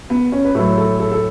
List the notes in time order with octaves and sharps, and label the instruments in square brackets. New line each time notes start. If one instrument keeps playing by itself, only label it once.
[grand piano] B3
C#4
B4
A2 F#3 A4
A4
A4
A4